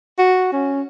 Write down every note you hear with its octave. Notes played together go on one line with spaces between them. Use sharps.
F#4
C#4